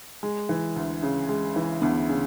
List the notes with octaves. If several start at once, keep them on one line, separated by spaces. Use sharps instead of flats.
G#3
E3
D2
C#3
G#3
E3
D2 B3 D4
C#3